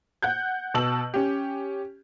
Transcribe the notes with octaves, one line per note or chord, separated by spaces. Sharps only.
F#5 F#6 G6
B2 A5 E6 F#7
C#4 G4